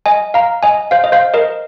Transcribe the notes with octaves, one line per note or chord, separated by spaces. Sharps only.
D#5 G#5
F5 A#5
D#5 G#5
C5 F5
D#5
C5 F5
A#4 D#5